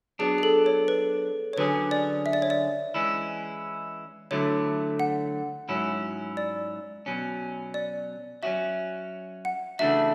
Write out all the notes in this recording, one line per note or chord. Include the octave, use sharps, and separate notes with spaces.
F#3 B3 D4 G#4
G#4
A4
C#5
B4
C#5
D3 F#3 C#4 G#4 B4
D5
E5
D5
C#5
D5
E3 G#3 C#4 E4
D3 F#3 A3 E4 C#5
F#5
G#2 F#3 C#4 E4
D5
B2 F#3 C#4
D5
F#3 C#4 F#4 E5
F#5
C#3 E3 A3 D4 F#4 E5